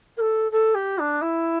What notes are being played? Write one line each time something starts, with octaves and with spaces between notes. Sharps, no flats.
A#4
A4
A4
G4
D4
E4